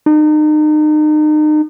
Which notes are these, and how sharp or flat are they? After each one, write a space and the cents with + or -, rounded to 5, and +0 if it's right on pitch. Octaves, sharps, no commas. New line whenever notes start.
D#4 -35